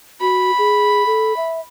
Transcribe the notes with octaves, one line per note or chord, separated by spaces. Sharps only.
F#4 B5
G#4
A4
E5